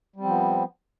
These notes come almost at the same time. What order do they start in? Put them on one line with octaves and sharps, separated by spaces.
G3 C4 F3 B3